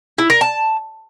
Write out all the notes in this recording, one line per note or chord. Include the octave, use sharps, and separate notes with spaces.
E4
A#4
A5